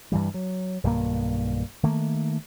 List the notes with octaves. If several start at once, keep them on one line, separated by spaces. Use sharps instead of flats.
G2 E3 G3
F#3
B1 G2 D#3 A#3
D#3 A3 A#3